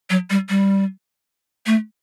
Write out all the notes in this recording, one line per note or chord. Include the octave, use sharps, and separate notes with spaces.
F#3
G3
G3
A3